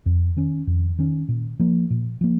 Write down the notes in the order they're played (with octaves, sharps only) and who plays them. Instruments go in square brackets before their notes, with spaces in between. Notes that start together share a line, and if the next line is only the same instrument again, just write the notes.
[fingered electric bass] F2
D#3 C#4
F2
D#3 C#4
A#2
F3 A#3
A#2
F3 A#3